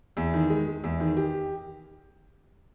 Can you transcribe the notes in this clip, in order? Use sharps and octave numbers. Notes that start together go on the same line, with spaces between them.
E2
D#3
G#3
G#3
E2
D#3
G4